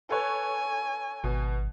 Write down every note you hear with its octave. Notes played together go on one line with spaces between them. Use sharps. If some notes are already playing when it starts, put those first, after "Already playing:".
A4 B4 C#5 G#5
G#1 B2